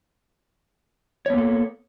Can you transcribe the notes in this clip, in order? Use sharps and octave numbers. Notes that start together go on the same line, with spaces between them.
A#3 B3 A4 C#5